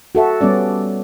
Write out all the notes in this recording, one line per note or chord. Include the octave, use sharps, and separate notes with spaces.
F#4 A4 E5
G3 B3 C#4 D5